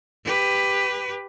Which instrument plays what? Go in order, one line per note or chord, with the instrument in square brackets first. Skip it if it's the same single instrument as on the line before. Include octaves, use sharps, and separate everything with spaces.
[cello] G4 B4